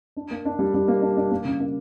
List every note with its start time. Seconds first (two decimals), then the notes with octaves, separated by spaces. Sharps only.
0.17 D4
0.31 A#3
0.45 D4
0.59 G3
0.74 G3
0.88 A#3
1.02 D4
1.17 D4
1.31 A#3
1.45 C#3
1.60 A#3